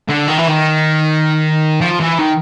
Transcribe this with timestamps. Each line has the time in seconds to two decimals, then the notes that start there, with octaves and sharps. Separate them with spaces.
0.09 D3
0.28 D#3
0.38 E3
0.48 D#3
1.81 F3
2.00 E3
2.18 D#3